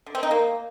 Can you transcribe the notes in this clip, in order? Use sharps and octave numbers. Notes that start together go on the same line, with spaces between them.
D3
C4
D#4
A#3